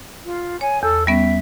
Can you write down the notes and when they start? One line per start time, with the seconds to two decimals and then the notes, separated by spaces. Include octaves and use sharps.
0.25 F4
0.61 C#5 G#5
0.83 E2 A4
1.07 G3 B3 C#4 E5